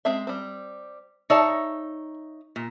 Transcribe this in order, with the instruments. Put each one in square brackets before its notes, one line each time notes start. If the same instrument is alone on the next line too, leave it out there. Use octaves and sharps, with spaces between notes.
[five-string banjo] G#3 C4 E5
G3 C4
[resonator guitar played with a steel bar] D#4 C#5 E5 [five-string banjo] G#4 D5 A5
[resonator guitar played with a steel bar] A#2